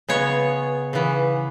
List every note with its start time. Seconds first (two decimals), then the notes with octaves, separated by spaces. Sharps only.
0.09 C#3 G#3 B3 C#5
0.93 C#3 E3 B3